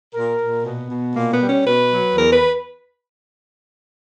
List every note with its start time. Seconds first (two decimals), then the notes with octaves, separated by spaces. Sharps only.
0.14 A#2 A#4
0.41 A#2
0.65 B2 B3
0.91 B2
1.15 A#2 A#3
1.32 B3
1.40 G3
1.48 C#4
1.66 B2 B4
1.91 F#3
2.16 E2 A#4
2.33 B4